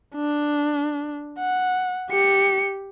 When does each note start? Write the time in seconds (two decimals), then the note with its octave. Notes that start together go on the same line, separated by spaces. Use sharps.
0.15 D4
1.38 F#5
2.10 G4 C#7